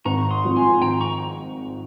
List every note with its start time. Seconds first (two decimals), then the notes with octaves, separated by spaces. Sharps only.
0.05 G#1 A#5 C#6
0.31 C6 D#6
0.44 G#2 F3 C4
0.56 G#5 C6
0.82 G#1 G5 A#5
1.01 A#5 C#6